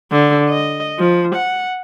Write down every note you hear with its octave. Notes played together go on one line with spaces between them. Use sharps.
D3
D#5
F3
F#5